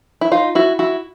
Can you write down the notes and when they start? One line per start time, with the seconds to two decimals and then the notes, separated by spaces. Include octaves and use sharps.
0.21 E4
0.32 D#4 F4
0.55 E4 F#4
0.79 E4 F#4